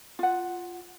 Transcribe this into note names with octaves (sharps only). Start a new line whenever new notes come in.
F4 F#5